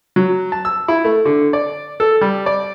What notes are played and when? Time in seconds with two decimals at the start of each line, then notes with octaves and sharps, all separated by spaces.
0.16 F#3
0.52 A5
0.65 E6
0.88 E4
1.04 A3
1.25 D3
1.53 D5
2.00 A4
2.21 G3
2.46 D5